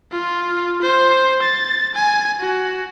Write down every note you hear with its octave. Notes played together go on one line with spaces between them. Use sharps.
F4
C5
A6
G#5
F#4